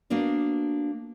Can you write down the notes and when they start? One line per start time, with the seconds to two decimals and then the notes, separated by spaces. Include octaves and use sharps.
0.10 A#3 B3 D4 F#4